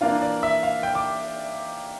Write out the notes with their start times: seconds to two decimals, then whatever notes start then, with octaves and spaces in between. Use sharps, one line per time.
0.01 E3 A#3 D4 F4 F5
0.22 D5
0.43 E5
0.63 F5
0.83 G5
0.95 D6